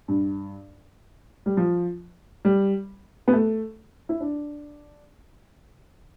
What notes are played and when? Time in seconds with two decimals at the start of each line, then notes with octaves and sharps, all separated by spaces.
0.08 G2
1.46 G3
1.57 F3
2.45 G3
3.28 B3
3.33 A3
4.09 E4
4.20 D4